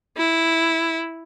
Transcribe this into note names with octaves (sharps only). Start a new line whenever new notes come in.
E4